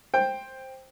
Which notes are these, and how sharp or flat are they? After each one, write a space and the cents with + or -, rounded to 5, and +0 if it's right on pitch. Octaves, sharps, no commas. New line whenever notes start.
C5 +10 G5 +10